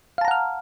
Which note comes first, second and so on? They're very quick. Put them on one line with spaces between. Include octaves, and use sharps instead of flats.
F5 A5 A#5 F#5 F6